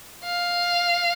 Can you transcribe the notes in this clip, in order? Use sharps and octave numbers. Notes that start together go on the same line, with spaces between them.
F5